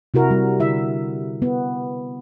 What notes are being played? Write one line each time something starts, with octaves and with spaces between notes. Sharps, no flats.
C3 E4 F#4 A#4
G3
D3 E4 E5
B3